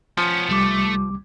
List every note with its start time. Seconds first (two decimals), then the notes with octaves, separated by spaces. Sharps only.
0.18 F3 B3 C#4
0.49 C2 G3 A3 D6